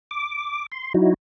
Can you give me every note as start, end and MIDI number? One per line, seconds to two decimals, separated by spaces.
0.11 0.66 86
0.72 0.93 84
0.94 1.14 54
0.94 1.14 63
0.94 1.14 64
0.94 1.14 66